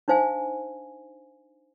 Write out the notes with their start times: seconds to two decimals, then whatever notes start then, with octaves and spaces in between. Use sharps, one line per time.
0.08 D4 D#4 C5 F5 G#5